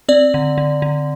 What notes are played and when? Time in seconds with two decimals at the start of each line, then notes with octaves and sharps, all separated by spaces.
0.09 C4 D5
0.34 D3
0.58 D3
0.82 D3